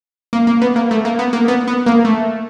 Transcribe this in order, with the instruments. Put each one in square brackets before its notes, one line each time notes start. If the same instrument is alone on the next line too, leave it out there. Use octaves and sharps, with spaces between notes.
[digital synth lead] A#3
A#3
B3
A#3
A3
A#3
B3
A#3
B3
B3
A#3
A3